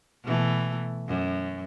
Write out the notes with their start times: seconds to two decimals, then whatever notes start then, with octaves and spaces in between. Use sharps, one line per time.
0.24 B2 E3 A3
1.08 F#2